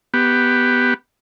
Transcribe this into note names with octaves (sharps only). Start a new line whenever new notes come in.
B3 G4